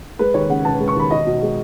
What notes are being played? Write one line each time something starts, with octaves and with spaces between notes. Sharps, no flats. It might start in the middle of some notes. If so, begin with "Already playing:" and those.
G#3 B4
D#2 C#5
C#3 F#5
E1 A5
G#3
C#6
D#2 B5
B1 D#5
B2
G#3